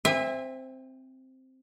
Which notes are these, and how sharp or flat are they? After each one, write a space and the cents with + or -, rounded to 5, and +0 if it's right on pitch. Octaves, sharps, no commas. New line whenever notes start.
C4 +0 E5 +0 G#5 -35